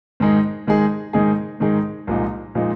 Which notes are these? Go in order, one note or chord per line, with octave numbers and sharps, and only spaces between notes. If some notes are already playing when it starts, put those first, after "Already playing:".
G#2 D#3 G#3 D#4 G#4
G#2 D#3 G#3 D#4 G#4
G#2 D#3 G#3 D#4 G#4
G#2 D#3 G#3 D#4 G#4
C2 A#2 F3 G#3 D#4
A#2 F3 G#3 D#4